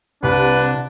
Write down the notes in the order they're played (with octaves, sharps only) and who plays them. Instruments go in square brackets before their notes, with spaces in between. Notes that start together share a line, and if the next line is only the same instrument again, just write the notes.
[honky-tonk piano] C2 [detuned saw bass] C3 [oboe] D4 [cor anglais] B4